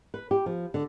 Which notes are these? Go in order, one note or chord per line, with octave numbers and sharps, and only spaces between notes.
B4
G4
F3
D3